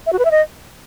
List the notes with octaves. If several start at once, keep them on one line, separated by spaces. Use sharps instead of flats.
E5
F#4
B4
E5
D#5